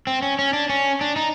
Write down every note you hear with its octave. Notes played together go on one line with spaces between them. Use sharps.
C4
C#4
C#4
D4
C#4
D4
D#4